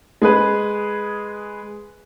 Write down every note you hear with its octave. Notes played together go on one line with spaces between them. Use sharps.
G#3 G#4 B4